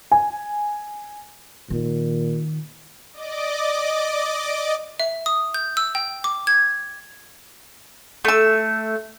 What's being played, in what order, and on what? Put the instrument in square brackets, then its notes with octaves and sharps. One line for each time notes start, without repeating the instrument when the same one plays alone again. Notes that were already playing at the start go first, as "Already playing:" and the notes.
[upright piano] G#5
[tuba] A#2 [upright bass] D#3
[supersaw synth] D5 D#5 D6
[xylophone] E5
D#6
G6
E6
G5
D6
G#6
[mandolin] A3 E6